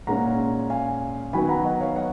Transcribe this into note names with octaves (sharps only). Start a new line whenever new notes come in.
A#2 G#3 C#4 F#5 A#5
F5 G#5
D#3 F#3 B3 G#5 B5
F#5 A#5
D#5 F#5
C#5 F5
D#5 F#5